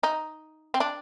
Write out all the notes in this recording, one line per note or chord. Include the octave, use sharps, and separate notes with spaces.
D#4
C4
D4